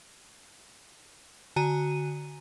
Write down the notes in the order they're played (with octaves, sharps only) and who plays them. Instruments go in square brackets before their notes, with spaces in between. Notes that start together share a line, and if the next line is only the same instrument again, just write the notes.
[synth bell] D3 F#4 G#5 A#5 D#7